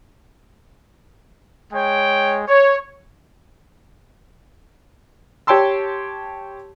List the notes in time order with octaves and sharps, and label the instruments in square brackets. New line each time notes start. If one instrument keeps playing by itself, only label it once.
[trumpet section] G#3 C#5 G5
C#5
[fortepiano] G4 C#5 G5 A5 C6 E6